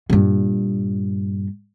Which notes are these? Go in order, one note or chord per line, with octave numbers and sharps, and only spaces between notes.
G2 A#2